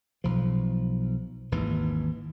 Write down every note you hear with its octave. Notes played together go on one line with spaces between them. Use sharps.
B1 F3
G#1 D#2 E3